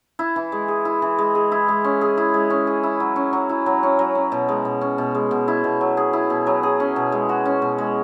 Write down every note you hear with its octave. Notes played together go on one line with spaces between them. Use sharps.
E4
E3
G#3
G#4
E4
E3
G#3
G#4
E4
G#3
C#4
G#4
E4
G#3
C#4
G#4
E4
F#3
C#4
F#3
E4
F#3
C#4
F#3
C#4
B2
G#3
B2
C#4
B2
G#3
B2
E4
B2
F#3
G#4
E4
B2
F#3
G#4
C#4
B2
G#3
F#4
C#4
B2
G#3